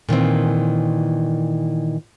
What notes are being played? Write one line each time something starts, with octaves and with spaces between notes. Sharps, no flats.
A#2 D#3 E3 C4